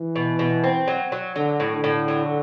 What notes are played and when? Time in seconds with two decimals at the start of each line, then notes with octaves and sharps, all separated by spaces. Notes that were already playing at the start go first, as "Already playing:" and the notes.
Already playing: E3
0.16 B2
0.39 B2
0.64 C4
0.88 F#3
1.12 F#3
1.36 D3 F#3
1.60 A2
1.72 D3
1.84 A2
2.08 F#3